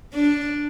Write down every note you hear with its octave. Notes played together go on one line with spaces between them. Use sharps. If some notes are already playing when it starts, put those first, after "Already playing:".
D4